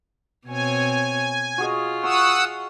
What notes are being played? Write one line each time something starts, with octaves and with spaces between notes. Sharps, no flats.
B2 C4 C#5 G#5
F4 F#4 G#4 D#5
F#5 C#6 D#6 E6